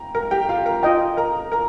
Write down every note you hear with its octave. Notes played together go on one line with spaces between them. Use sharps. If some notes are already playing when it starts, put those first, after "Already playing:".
Already playing: G5 A#5
A#4 A#5
G4 G5
F4 F5
A#4 A#5
F4 D#5 G5
A#4 A#5
A#4 A#5